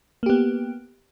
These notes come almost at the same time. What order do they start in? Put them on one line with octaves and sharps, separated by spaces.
A#3 G4 B3